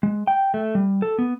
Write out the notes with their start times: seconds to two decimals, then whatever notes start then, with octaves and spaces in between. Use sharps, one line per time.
0.03 G#3
0.27 G5
0.54 A3
0.75 G3
1.02 A4
1.19 B3